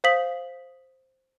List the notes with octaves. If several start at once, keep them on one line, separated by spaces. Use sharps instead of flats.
C5 F5 D#6 B6 F#7